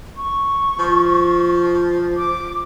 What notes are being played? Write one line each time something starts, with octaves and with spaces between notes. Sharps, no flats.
C#6
F3
D6